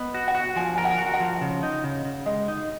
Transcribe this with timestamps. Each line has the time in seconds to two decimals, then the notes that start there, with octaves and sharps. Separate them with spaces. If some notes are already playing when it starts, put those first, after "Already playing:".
Already playing: B3 D#5
0.14 F#4
0.28 F#5
0.35 F#4
0.56 F3 G#5
0.76 A#4 G#5
0.85 F#5
0.98 F#4
1.14 F#5
1.20 F3
1.41 C#3
1.63 D#4
1.84 C#3
2.05 C#3
2.26 G#3 D#5
2.48 D#4